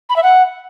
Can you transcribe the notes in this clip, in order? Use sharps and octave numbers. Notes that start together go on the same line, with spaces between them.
B5
E5
F#5